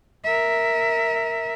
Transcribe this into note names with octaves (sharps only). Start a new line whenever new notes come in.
A#4 E5